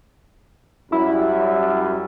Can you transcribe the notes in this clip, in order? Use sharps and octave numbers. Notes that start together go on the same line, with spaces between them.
F#2 G3 E4